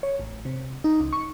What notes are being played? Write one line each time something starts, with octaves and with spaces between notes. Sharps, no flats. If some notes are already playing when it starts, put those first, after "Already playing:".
C#5
A1
C3
D#4
C#2
C#6